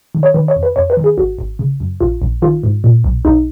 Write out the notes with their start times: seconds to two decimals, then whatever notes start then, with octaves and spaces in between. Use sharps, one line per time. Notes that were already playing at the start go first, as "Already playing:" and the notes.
0.15 D#3
0.23 C#5
0.34 D#3 B4
0.48 C#5
0.56 F2
0.63 B4
0.76 F2 C#5
0.90 B4
0.97 D#3
1.04 G#4
1.18 G#1 F#4
1.39 G#1
1.59 C#3
1.80 F#2
2.00 A#1 F4
2.22 A#1
2.42 D#3 F4
2.63 G#2
2.84 A#2
3.04 B1
3.25 B1 D#4